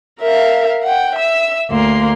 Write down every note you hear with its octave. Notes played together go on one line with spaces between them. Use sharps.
A#4 E5 F5
F#5 G5
E5 E6
D2 A#3 C6